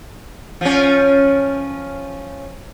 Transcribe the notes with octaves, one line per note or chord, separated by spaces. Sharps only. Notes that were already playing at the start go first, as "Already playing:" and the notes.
F3 C#4